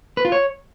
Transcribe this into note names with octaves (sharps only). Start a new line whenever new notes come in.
B4
F4
C#5